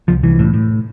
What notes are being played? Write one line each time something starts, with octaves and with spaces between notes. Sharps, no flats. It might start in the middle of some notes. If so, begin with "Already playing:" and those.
C2 F3
C2 E3
A2
A2